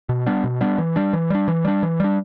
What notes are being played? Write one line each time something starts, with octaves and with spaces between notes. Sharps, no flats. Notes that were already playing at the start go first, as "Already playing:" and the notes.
B2
G3 B3 D4
B2
G3 B3 D4
E3
G3 D4
E3
G3 D4
E3
G3 D4
E3
G3 D4